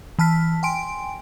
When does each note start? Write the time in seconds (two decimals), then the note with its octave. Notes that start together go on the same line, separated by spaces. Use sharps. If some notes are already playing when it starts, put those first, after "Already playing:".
0.19 E3 A5 F6 B6
0.63 G5 G#5 C6 D7